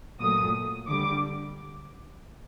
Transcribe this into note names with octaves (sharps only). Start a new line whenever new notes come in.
A#2 F#3 A3 D#6
D3 G3 D6